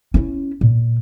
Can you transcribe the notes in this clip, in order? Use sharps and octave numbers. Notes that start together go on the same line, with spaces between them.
C#4 E4
A#2